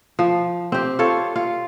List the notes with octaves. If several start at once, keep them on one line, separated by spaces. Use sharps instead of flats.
F3
C4 G4
F4 A4 C#5
F4